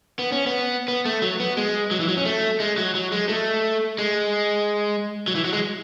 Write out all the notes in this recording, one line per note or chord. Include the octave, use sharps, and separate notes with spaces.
B3
C#4
B3
B3
A3
F#3
B3
G#3
F#3
E3
F#3
C#4
A3
G#3
F#3
F#3
G#3
A3
G#3
F#3
E3
F#3
G#3